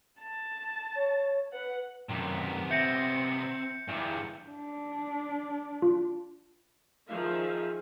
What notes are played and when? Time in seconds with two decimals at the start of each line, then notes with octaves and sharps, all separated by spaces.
0.19 A5
0.95 C#5
1.53 B4 F#5
2.09 F#2 C3 D#3 B3
2.71 C4 E5 G6 A#6 C#7 D#7
3.89 G2 D3 E4 G#4
4.50 D4
5.82 F4
7.07 D#3 F3 G#4 E5 F5